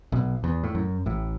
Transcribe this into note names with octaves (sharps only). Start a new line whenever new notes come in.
B1 B2
E2
A2
F#2
A1 A2